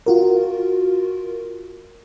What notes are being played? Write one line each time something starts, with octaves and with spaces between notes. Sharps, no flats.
F4 F#4 A#4